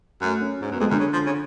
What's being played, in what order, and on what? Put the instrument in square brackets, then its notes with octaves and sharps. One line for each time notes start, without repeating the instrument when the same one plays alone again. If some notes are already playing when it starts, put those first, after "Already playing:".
[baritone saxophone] F#2 [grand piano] A3
[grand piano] C#4
[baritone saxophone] G#2 [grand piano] C#4
[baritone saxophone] F#2 [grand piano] B3
[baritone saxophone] F2 [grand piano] G#3
[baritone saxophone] F#2 [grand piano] D3
[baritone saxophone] C#3
F3
C#3